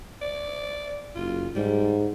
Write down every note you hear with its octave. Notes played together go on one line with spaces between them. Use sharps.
D5
F#1 F4
G#2 G3